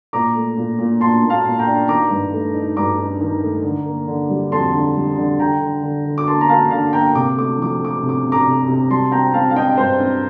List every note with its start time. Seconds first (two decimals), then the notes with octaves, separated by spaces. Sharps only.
0.13 A#2 A#5 D6
0.35 A3
0.57 A#2
0.79 A#2
1.00 A#2 A5 C6
1.23 A#2
1.30 F5 A5
1.45 A#2
1.59 G5 A#5
1.67 D4
1.88 D#3 A#5 D6
2.10 G2
2.32 A3
2.55 D#4
2.76 G2 A#5 D6
2.98 D#4
3.21 D#3
3.42 A3
3.64 D3
3.85 A#3
4.08 D3
4.30 G3
4.52 F2 A5 C6
4.73 D3
4.96 G3
5.17 D3
5.39 D3 G5 A#5
5.61 D3
5.83 D3
6.05 D3
6.18 D6
6.27 A#3 A5 C6
6.41 A#5
6.48 A#3 F5 A5
6.71 D3 F5 A5
6.93 A#3 G5 A#5
7.15 C3 D6
7.36 A3 D6
7.59 F3 D6
7.80 A3 D6
8.02 C3
8.09 D6
8.25 C3
8.32 A#5 D6
8.47 C3
8.68 C3
8.90 G3 A5 C6
9.11 C4 G5 A#5
9.33 C4 F5 A5
9.51 F5
9.55 C4 D#5 G5
9.77 G2 C5
10.00 C4